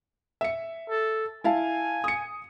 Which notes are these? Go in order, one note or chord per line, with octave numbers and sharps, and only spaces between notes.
E5 C#7
A4
E4 F5 G#5 A5
D#6 C#7